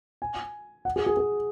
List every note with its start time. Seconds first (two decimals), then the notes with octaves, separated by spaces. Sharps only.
0.22 G#5
0.85 F#5
0.96 G#4
1.06 G#4
1.17 G#4